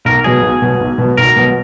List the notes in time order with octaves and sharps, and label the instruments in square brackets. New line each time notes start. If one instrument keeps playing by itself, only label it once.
[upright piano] B1 [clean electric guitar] A#4
[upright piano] B2 F#3 [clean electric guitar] G#4
[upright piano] B1
B2 F#3
B1
B2 F#3
[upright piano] B1 [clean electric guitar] A#4
[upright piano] B2 F#3